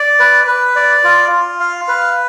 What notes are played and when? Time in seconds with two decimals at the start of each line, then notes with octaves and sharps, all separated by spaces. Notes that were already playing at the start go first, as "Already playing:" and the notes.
Already playing: D5
0.20 B4
0.47 B4
0.76 D5
1.04 F4
1.32 F4
1.60 F5
1.88 B4